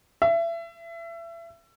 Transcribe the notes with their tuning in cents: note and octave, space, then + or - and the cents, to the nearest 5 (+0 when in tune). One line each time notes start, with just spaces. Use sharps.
E5 +30